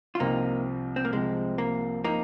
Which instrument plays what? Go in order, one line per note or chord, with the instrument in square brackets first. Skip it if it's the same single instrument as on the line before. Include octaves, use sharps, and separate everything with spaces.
[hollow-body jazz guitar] F4
[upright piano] C2 C3 F3 C4 [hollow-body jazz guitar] A#3 D#4
[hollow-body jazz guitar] C4
A#3
[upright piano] C2 C3 F3 C4 [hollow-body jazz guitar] G#3
[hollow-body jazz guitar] A#3
[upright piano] C3 F3 C4 [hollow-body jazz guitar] A#3 D#4